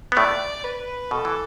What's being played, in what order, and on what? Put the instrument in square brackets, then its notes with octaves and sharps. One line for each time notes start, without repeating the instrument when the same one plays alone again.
[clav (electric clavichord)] B3
[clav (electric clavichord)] A2 A3 [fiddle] D5
[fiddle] B4
[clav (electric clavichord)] B2 [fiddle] A4
[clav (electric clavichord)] E3